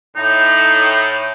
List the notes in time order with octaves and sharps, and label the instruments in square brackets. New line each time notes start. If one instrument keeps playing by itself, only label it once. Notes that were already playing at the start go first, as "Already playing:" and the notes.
[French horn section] A2 [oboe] D#4